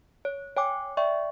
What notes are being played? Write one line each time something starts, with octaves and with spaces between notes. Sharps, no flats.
C#5
C#5 G5 G#5 D6
D5 E5 G5 C#6